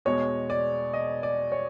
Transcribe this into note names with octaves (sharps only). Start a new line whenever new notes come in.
E2 B2 G#3 C#5
D5
D#5
D5
C#5